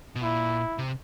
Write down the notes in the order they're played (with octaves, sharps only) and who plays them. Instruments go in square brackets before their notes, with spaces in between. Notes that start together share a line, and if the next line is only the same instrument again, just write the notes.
[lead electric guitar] B2
[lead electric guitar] A#2 [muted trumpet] E4
[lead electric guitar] C3